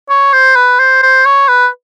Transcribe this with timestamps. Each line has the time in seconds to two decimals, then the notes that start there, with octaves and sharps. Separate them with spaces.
0.10 C#5
0.33 C5
0.56 B4
0.79 C5
1.03 C5
1.25 C#5
1.48 B4